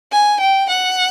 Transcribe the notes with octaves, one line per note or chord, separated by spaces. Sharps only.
G#5
G5
F#5